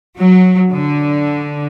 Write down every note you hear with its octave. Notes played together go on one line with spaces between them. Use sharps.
F#3
D3